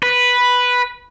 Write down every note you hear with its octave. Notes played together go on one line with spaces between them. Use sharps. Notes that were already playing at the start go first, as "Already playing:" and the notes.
B4